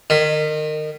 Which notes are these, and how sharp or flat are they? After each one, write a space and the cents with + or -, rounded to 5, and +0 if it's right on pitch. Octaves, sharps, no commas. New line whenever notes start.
D#3 -25